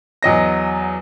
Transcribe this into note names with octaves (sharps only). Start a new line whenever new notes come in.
E2 F#3 D#5 A#6